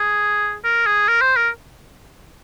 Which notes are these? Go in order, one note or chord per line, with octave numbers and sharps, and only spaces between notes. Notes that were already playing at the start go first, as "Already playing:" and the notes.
Already playing: G#4
A#4
G#4
A#4
C5
A#4